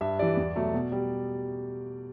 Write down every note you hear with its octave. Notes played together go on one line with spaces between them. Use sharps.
G2 E5
E3 G3 D5
E2
B2 F#3 A3
B2
G3